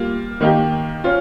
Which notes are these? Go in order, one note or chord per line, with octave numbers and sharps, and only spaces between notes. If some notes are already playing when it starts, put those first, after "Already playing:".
Already playing: G3 A#3 F4
D#3 A#3 D#4 G4
C#4 F4